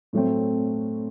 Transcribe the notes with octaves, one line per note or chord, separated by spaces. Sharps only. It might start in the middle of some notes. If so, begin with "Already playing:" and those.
A2 F#3 A3 C4